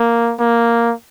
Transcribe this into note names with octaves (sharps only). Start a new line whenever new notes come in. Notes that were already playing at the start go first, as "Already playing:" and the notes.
Already playing: A#3
A#3